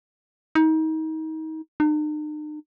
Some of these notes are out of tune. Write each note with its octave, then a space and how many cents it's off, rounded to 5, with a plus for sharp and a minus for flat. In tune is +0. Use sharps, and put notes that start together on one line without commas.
D#4 +30
D#4 -45